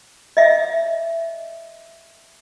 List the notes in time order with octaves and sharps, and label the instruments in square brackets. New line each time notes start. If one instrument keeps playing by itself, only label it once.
[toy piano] D#5 E5